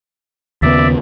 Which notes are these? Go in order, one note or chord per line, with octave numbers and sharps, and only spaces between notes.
D#2 C#3 B3 D5 E5